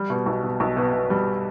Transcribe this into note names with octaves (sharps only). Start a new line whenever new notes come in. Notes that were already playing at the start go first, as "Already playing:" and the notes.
Already playing: G3
B2
B1
B2
B1
B2
B2
G3